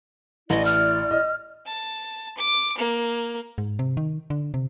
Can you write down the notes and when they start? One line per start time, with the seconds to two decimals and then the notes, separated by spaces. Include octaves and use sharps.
0.50 A1 E4 D5 D#5
0.65 F6
1.11 D#5
1.66 A5
2.37 D6
2.78 A#3
3.58 G#2
3.79 C3
3.97 D#3
4.30 D3
4.54 C3